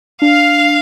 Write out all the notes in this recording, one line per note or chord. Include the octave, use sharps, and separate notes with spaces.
D4 F5 F6